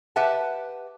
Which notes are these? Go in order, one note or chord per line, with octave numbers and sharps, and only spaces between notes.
G4 B4 E5 F#5 A5